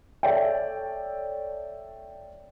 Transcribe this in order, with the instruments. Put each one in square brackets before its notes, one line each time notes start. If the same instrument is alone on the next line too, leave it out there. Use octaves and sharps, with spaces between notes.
[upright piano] A4 C#5 D5 E5 G5